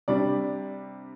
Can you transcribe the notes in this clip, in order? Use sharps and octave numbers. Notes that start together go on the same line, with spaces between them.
C3 G3 D4 D5